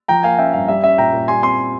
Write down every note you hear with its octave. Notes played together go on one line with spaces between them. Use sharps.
F3 G5 A#5
A#3 F5 G#5
C#4 E5 G5
G2 F5
G3 E5
C#4 E5
A#2 G5 A#5
A#2
G3 G#5 C6
C4 G#5 C6